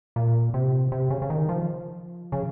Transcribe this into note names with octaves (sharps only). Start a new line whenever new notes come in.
A#2
C3
C3
C#3
C#3
D#3
F3
C#3